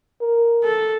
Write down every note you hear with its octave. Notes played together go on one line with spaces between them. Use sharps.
A#4
A4